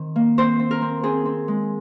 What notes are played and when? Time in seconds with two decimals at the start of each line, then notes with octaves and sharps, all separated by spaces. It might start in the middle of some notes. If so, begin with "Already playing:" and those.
Already playing: D#3 C4
0.16 A#3
0.38 C4 C5
0.59 C4
0.71 A#4
0.82 C4
1.03 C4 G#4
1.25 C4
1.48 G#3